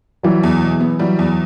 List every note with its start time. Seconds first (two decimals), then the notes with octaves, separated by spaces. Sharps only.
0.23 E3 F#3 G3
0.43 E2
0.62 B2
0.80 B3
0.99 E3 F#3 G3
1.19 E2